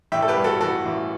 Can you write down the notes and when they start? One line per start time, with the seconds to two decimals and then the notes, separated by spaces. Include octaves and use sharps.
0.12 A1 E5 G5
0.22 A4
0.28 G4 B4
0.37 G2
0.44 F#4 A4
0.61 E3 F#4 A4
0.85 A1